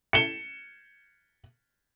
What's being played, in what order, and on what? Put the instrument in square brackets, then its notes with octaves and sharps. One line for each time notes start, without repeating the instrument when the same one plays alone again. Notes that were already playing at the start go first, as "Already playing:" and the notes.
[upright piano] C#7 E7 G7